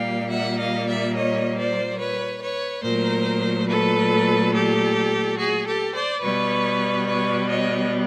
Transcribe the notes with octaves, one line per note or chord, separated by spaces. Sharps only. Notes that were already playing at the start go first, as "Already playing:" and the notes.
Already playing: A#2 G3 A#3 F5 G5
E5 F#5
D#5 F5
D5 E5
C#5 D#5
C5 D5
B4 C#5
B4 C#5
A#2 F#3 A3 A#4 C5
A4 B4
G4 A4
F#4 G#4
G4 A4
C5 D5
B2 G3 B3 B4 C#5
B4 C#5
C#5 D#5